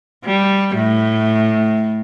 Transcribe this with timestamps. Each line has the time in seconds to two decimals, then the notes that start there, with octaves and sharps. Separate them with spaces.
0.25 G3
0.76 A2